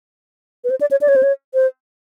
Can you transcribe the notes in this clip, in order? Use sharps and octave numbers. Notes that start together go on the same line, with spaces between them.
B4
C5
D5
C#5
D5
C#5
C5
C#5
C5